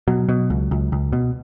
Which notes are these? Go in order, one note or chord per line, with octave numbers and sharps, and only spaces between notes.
B2 F#3
B2
C#2
C#2
C#2
B2